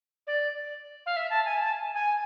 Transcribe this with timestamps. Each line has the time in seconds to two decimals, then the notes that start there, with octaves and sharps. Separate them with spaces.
0.27 D5
1.06 F5
1.16 E5
1.30 A5
1.45 G#5
1.60 A5
1.95 G#5